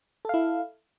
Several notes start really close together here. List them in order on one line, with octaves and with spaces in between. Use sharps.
A4 F5 E4